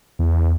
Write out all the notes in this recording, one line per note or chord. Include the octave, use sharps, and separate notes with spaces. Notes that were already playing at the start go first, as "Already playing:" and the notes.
E2